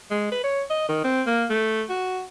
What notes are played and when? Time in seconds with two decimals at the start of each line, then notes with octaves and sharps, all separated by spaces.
0.11 G#3
0.32 B4
0.44 C#5
0.70 D#5
0.89 D#3
1.04 C4
1.26 A#3
1.50 A3
1.89 F#4